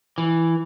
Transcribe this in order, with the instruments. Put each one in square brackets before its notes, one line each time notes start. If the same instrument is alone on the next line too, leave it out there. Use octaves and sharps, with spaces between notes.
[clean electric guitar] E3